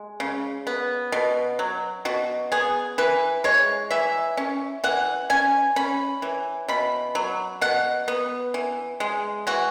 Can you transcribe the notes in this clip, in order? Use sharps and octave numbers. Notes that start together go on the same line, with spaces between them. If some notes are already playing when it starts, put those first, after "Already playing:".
Already playing: G#3
C#3
B3
B2
F#3
B2 F#4
B3 G#4
E3 B4
G#3 C#5
E3 E5
C#4
E3 F#5
C#4 G#5
C#4 B5
E3
B2 B5
F#3
B2 F#5
B3
E3
G#3
E3 F#4